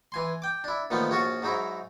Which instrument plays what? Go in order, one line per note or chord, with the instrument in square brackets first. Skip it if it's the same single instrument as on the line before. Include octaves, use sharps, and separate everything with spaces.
[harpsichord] E3 G#5 C6
G5 D6
D4 E4
A#2 D#3 F3 A3 B3
A#1 C#4 F#4 A5 C#6
G#2 F#3 D#4 E4